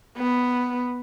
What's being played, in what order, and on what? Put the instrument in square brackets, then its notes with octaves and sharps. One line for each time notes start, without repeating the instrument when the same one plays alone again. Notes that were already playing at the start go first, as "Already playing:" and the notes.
[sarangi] B3